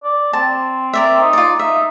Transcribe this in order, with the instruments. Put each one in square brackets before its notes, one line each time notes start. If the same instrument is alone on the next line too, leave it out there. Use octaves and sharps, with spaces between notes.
[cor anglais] D5
[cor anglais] C4 [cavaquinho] A5
[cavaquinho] A#4 D5 E5
[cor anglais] D#4
[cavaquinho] F4 D5
[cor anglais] D#4 [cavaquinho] E5